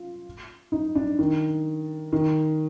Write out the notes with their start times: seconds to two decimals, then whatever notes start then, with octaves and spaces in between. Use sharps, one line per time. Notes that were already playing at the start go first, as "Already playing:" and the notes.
Already playing: F4
0.72 D#4
0.95 D4
1.19 D#3
2.13 D#3